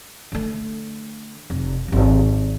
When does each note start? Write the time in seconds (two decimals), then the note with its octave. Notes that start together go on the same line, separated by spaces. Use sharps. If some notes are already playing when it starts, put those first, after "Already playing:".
0.32 D3 A3
1.50 F1
1.88 D#1 G#1